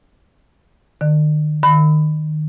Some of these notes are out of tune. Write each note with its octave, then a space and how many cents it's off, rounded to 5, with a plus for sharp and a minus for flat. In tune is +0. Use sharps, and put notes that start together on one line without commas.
D#3 -40 D5 +35
D#3 -20 B5 +20